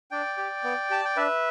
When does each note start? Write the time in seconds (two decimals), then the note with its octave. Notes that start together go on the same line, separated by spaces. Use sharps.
0.11 D4 D5 G5
0.38 G4
0.64 B3
0.90 G4 A5
1.05 G5
1.16 D4 B4 E5